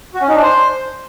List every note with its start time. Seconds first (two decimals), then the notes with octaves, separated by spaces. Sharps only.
0.14 F#4
0.21 C#4
0.28 D#4
0.35 D4
0.42 C5